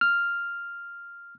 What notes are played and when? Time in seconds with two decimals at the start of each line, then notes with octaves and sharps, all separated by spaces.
0.01 F6